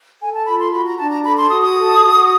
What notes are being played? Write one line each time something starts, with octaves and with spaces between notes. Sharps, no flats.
A4 G#5
A5
F4 B5
C6
F#4 B5
A#5
D4 A5
A#5
A4 B5
C6
F#4 D#6
D#6
A4
F#4